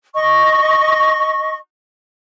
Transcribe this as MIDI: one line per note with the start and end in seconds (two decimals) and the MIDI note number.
0.14 1.58 75
0.14 1.58 85